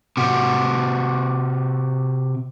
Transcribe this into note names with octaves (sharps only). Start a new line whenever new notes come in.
C3 F#4